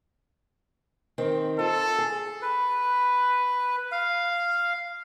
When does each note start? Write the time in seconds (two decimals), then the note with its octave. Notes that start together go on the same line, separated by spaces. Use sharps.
1.18 D#3 C4
1.59 F4 A4
1.98 G#4
2.42 B4
3.92 F5